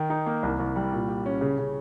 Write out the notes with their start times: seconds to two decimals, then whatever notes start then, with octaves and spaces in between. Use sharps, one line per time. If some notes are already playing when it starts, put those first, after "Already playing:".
Already playing: D#3
0.10 D#4
0.26 A#3
0.43 C2
0.59 C2
0.76 G3
0.93 A#2
1.09 G4
1.26 C#4
1.41 C#3
1.58 C#3